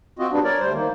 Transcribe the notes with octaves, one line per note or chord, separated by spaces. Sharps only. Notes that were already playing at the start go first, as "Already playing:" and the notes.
C4 F4 F#4 D#5
G3 B3 D4
A#4 C#5 D5
D2 G3 C5
D#3 A#3